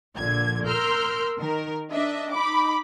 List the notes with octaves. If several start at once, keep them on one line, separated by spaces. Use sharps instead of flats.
A#1 A#2 D3 G#6
A#4 C6 E6 F6 G6
D#3 A#4
D4 D#5 E5
D#4 B5 D6